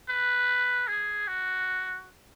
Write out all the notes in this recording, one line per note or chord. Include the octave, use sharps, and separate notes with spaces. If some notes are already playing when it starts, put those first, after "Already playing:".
B4
G#4
F#4